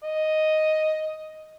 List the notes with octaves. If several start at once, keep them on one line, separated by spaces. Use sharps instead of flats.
D#5